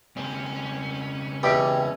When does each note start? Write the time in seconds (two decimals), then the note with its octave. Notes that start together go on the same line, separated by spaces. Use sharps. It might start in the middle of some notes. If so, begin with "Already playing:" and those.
0.17 C#3 G#3 C4 C#4
1.43 E2 B2 G4